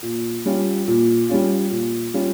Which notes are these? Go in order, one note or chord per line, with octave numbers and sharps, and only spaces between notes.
A#2
G3 C#4 F4
A#2
G3 C#4 F4
A#2
G3 C#4 F4